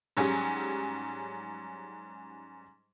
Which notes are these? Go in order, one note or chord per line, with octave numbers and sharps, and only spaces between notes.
G#2 F#3 G3 C#4 G4 G#4